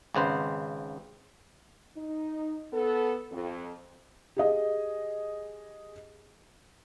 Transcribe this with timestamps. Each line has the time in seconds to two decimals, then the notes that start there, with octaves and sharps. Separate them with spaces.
0.15 G#1 C#3 B4 C5
1.96 D#4
2.73 B3 A4
3.32 F2
4.36 G4 G#4 D#5